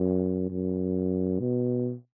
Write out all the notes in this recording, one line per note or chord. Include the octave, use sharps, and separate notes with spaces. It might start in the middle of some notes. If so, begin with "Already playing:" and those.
Already playing: F#2
F#2
B2